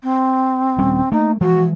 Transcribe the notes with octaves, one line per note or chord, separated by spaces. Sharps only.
C4
D#1 G3 C#4
A3 A#3 D#4
E3 F3 G#3 F#4